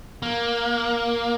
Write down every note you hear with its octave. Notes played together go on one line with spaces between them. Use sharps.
A#3